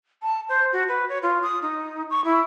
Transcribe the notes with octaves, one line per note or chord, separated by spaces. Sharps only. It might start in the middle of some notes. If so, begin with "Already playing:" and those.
A5
C5
F#4
B4
C#5
F4
D#6
D#4
C#6
E4